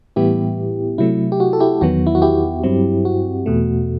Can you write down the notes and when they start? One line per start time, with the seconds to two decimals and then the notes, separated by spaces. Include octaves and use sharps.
0.16 A2 E3 G3 B3 E4 G4
0.98 C3 F#3 A3 E4
1.32 G4
1.40 F#4
1.53 A4
1.60 E4 G4
1.81 E2 D#3 F#3 B3 F#4
2.07 E4
2.15 F#4
2.22 E4 G4
2.64 G2 F#3 C4
3.05 F#4
3.46 E2 B2 A3